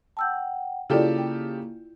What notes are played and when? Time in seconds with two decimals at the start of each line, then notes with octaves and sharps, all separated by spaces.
0.17 F#5 G5 A5 E6 G6
0.90 C#3 A#3 E4 F4 G4 A4 D5
1.18 G5